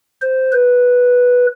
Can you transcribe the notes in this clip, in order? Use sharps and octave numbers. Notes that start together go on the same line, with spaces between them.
C5
B4